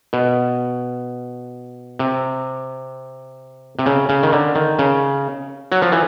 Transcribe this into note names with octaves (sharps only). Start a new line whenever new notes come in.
B2
C3
C3
C#3
C#3
D#3
D3
D#3
C#3
F#3
F3
E3